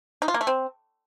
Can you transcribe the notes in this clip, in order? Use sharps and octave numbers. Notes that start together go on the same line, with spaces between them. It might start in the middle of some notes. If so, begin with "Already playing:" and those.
D#4
F4
A#3
A3
C4